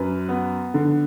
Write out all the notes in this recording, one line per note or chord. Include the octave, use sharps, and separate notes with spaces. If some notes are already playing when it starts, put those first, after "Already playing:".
Already playing: F#2 B4
B3
D3